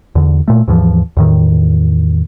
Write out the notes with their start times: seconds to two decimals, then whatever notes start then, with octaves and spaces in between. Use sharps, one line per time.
0.15 E2 D3
0.48 A#2 A3
0.68 D#2 G#2 E3 F3
1.17 E2 A2 D#3